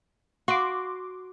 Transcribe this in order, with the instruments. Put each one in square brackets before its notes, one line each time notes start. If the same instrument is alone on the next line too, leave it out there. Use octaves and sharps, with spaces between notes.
[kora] F#4 [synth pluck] C6 D6